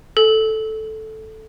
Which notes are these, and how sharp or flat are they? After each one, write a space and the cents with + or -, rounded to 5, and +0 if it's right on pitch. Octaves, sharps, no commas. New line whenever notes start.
A4 -5